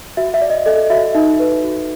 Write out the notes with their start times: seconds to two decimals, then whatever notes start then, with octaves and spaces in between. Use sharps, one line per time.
0.17 F#4 E5
0.34 E5
0.41 D5
0.50 D#5
0.66 A4 D#5
0.90 F#4 E5
1.14 D#4 E5
1.39 B4
1.63 F#4